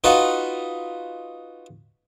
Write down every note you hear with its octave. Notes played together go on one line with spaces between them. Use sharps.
D#4 F4 F#4 B4